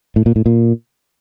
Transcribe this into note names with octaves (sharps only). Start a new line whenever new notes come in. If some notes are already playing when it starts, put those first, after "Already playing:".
A2
A#2
A2
A#2